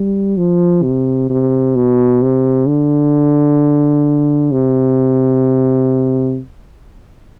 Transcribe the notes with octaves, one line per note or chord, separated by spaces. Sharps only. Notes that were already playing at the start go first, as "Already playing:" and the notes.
Already playing: G3
F3
C3
C3
B2
C3
D3
C3